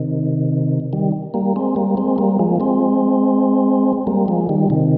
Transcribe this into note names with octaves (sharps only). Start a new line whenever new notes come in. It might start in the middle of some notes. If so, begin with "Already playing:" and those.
Already playing: C3 D#3
D#3 G3
G3 A#3
G#3 C4
G3 A#3
G#3 C4
G3 A#3
F3 G#3
G#3 C4
G3 A#3
F3 G#3
D#3 G3
C3 D#3